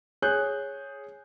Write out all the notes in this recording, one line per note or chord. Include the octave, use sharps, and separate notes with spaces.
G#4 C#5 F#6 G6